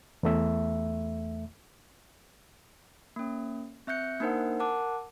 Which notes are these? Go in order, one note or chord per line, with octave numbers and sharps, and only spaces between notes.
E2 A3 E5
A#3 C#4
C4 E5 F#6 G6 C#7
A#3 D4 D#4 A#4 C5 F#5
A#4 F#5 A5 D6 F#6